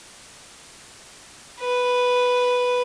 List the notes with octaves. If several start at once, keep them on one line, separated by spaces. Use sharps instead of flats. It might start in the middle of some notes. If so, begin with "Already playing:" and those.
B4